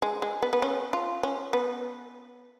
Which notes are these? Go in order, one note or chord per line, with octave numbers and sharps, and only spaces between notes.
G#3
G#3
B3
B3
C#4
F4
C#4
B3